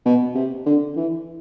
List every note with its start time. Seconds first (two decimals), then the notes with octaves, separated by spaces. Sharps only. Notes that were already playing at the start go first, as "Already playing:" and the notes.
0.06 B2
0.35 C3
0.66 D3
0.97 E3